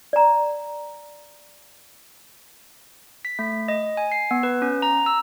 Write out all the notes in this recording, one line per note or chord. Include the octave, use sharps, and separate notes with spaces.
D5 A#5
B6
A3
D#5
G#5
C7
B3
B4
C#4
A#5
E6